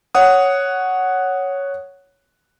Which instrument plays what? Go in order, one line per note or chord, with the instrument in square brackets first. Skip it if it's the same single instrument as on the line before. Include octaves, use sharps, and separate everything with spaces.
[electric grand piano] C#5 F#5 D#6